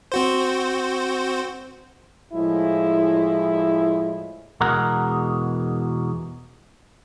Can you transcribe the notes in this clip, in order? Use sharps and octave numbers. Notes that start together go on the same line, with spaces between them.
C4 F#4 C5
A2 F3 G#3 E4
E2 B2 G#3 A#4 F#5